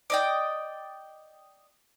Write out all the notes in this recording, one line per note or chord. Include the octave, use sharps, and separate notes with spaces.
D5 D#5 G5